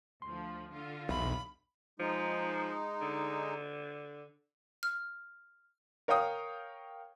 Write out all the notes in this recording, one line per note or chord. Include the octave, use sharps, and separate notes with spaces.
D2 F3 C6
D3 F4
B1 E2 E5 B5 C6
F3 G#3 D#4
D3
F6
A#4 C#5 F5 G5 D#6